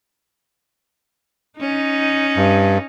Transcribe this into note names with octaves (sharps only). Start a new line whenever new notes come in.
C#4 D#4
G2